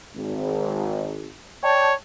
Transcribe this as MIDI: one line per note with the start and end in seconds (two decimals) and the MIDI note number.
0.15 1.36 32
1.64 1.94 73
1.64 1.88 74
1.64 1.88 79
1.64 1.88 81